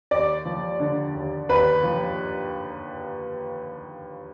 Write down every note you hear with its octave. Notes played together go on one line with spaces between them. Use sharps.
D#2 D5 D6
F3
D3
D#2
D#2 B4 B5
F3